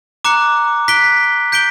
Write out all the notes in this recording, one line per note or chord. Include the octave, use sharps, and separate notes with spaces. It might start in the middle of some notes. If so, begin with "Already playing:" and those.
A#5 D6 F#6 C#7
F#6 B6 D7 G7
G6 B6 D7 G7